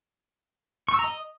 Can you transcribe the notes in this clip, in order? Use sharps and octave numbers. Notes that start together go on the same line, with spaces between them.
C#6
E6
A#5
D#5